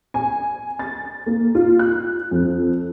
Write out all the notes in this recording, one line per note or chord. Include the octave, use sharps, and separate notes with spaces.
G#5
A6
A#3
F4
F#6
F2